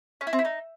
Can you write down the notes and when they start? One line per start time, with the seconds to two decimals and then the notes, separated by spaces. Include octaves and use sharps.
0.21 C#4
0.27 E4
0.33 C4
0.39 E4
0.45 D#4